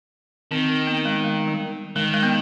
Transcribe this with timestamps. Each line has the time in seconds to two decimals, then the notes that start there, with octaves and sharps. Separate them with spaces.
0.51 D#3 C4
0.87 B3
1.05 G#3
1.24 G#3
1.48 G3
1.96 D#3 G#3
2.14 G#3
2.23 B3